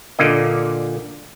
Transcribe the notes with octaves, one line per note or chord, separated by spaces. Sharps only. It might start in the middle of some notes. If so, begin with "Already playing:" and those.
A#2 D3 A#3 D#5